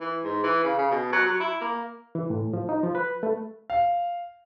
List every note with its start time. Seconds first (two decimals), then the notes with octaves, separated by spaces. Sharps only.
0.01 E3
0.24 G#2
0.44 E3
0.64 C#3
0.79 C#3
0.91 B2
1.12 F#3
1.26 F#3
1.40 E4
1.61 A#3
2.15 E3
2.30 A2
2.53 F3
2.69 D#4
2.83 F3
2.95 B4
3.23 A3
3.70 F5